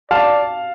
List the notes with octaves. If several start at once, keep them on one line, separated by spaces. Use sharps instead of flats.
D5 F5 A5